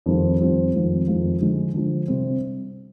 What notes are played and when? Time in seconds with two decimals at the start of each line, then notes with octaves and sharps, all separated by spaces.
0.06 F2 D#3 G3 C4 F4
0.40 F2 D#3 G3 C4 F4
0.74 F2 D#3 G#3 C4 F4
1.08 F2 D#3 G#3 C4 F4
1.40 D3 F3 G#3
1.74 D3 F3 G#3
2.08 C3 G3 C4